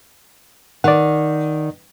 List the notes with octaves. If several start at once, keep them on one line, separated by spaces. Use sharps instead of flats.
D#3 D5 F#5